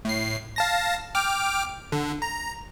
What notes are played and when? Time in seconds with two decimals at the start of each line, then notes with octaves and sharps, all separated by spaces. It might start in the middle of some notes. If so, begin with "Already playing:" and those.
0.05 A2 C7
0.56 F5 A5 A#6
1.15 G5 D6 F6
1.92 D3
2.22 A#5